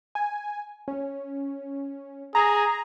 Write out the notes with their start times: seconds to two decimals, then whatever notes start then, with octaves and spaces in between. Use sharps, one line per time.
0.15 G#5
0.88 C#4
2.35 G#4 A#5